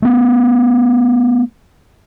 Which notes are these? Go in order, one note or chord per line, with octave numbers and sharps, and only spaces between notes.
A3 B3